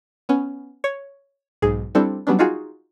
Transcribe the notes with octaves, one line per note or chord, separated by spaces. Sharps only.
B3 C#4
C#5
B1 G#2 G#4
G3 C4 D4 E4 A4
F#3 G3 B3 C#4 D4
D#4 F4 F#4 G#4